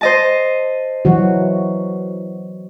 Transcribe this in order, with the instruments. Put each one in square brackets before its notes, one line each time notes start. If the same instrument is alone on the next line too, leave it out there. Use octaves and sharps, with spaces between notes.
[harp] C5 D#5 A5
[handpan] E3 F#3 F#4